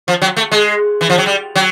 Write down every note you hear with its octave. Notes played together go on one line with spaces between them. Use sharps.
F3
F#3
A3
G#3
E3
F3
F#3
G3
F#3